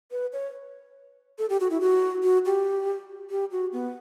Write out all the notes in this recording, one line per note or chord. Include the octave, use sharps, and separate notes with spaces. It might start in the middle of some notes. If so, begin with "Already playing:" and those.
B4
C#5
A4
G4
F#4
E4
F#4
F#4
G4
G4
F#4
B3